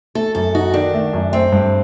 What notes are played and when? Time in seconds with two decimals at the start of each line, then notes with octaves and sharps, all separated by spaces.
0.15 A3 A4
0.35 F#2 A4
0.55 D#4 F#4
0.74 D#3 D4
0.94 A3
1.13 F#2
1.33 A3 C4
1.52 G2